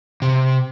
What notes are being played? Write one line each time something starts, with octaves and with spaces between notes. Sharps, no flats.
C3